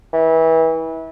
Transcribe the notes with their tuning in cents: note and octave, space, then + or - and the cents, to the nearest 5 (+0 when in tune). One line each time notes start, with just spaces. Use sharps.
E3 -25